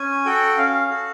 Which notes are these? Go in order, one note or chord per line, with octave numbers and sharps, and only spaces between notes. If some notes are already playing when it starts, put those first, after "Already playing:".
Already playing: C#4 G#5
F#4 A4 G5
C#4 F5
F#4 A4